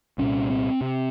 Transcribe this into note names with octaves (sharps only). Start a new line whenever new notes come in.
C2 A#2 C#4
C4
C3